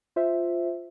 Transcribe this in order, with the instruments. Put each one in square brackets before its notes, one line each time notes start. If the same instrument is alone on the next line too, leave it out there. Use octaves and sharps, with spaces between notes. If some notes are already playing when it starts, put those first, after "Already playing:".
[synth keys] F4 C5 E5